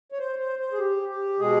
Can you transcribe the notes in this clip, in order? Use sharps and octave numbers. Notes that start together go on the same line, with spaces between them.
C#5
C5
C5
C5
G#4
G4
G4
B2 G#3 G#4